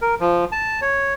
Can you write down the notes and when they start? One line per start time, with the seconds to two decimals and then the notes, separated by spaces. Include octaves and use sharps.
0.02 A#4
0.20 F3
0.52 A5
0.82 C#5